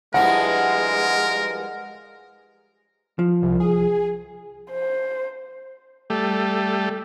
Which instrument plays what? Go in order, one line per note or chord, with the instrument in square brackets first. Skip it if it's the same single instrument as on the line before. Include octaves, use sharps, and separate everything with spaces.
[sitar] G2 F3 E4 [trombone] G#3 [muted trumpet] A#4 [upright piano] F#5
[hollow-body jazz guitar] F3
[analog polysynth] C2
G#4
[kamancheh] C5
[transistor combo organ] G3 A3